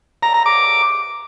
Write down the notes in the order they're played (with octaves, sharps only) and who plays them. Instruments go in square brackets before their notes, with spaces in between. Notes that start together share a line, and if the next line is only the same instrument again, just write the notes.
[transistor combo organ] A#5
A#5
D6